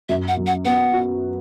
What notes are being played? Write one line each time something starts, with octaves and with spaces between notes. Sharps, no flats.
F#2 E5
F#5
F#3
F#5
B3 F#5
F#4